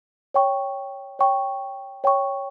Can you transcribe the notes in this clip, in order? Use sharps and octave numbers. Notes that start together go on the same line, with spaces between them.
C#5 G5 C#6
C#5 G5 C#6
C#5 G5 C#6